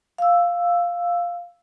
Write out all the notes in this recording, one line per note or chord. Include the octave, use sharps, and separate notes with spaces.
F5 E6